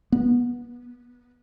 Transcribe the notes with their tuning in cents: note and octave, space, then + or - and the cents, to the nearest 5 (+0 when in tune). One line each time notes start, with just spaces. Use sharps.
B3 -20